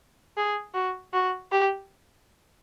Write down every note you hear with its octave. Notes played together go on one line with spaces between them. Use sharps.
G#4
F#4
F#4
G4